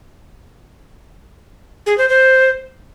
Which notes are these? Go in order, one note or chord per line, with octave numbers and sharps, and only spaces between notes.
G#4
C5
C5